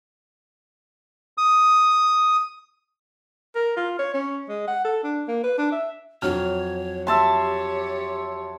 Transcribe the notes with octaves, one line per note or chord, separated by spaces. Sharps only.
D#6
A#4
F4
C#5
C#4
G#3
F#5
A4
D4
A#3
B4
D4
E5
F2 F#3 C#5 F6
G4 C#5 E5 A5 C6